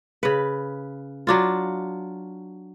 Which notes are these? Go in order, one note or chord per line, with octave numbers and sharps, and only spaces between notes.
C#3 B4
F#3 D4 F4